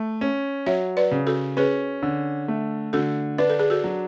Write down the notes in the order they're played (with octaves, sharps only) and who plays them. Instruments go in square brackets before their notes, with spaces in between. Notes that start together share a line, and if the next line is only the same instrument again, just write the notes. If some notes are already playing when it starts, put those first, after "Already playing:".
Already playing: [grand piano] A3
C#4
[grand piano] F#3 [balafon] C#5 E5
[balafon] B4 D5
[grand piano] C#3
[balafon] F#4 A4
[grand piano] C#4 [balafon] G#4 B4
[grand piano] D3
A3
[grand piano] D3 [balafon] F#4 A4
[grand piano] D4 [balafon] B4
[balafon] A4
G#4
F#4 A4
[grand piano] F#3